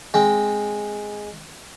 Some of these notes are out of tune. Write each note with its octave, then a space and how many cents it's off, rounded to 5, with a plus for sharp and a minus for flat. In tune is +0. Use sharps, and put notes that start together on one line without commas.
G#3 +0 C4 +0